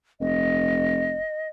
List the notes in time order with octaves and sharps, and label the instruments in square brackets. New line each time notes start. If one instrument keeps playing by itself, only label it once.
[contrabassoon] F1 [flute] D#5